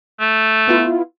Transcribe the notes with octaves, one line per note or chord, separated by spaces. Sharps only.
A3
B3 E4 F4